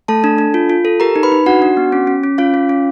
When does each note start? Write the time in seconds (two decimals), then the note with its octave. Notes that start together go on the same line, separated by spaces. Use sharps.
0.08 A3 A4 A5
0.24 D4
0.38 D4
0.54 F4
0.70 F4
0.85 A4
1.00 G4 A#4 A#5
1.16 D#4
1.23 B4 B5
1.32 D#4
1.46 D4 F#4 F#5
1.62 D4
1.77 B3
1.92 C#4
2.07 C#4
2.23 C#4
2.38 C#4 F4 F5
2.54 C#4
2.69 C#4